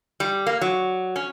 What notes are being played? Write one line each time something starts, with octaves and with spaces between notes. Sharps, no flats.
G3
A#3
F#3
C#4